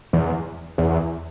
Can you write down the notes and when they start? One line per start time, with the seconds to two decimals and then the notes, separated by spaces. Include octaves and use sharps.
0.13 E2
0.78 E2